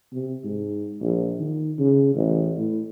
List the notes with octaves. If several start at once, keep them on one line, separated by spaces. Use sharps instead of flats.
C3
G#2
A#1
D#3
C#3
A1
A2